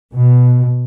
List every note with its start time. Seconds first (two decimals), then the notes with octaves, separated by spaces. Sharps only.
0.13 B2